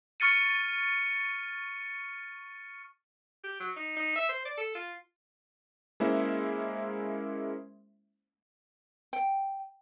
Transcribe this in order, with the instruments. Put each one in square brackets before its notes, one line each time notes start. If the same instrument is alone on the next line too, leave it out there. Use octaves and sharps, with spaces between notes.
[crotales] C#6 F6 A6 C#7 D#7
[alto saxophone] G4
F#3
D#4
D#4
E5
C5
D5
A4
F4
[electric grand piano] G#3 A#3 C#4 E4 C5 E5
[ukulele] G5